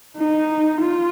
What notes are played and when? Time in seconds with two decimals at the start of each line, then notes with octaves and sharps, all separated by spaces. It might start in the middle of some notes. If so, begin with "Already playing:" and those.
0.17 D#4
0.81 F4